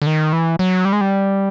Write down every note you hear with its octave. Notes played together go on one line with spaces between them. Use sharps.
D3
D#3
E3
F#3
G3
G#3
G3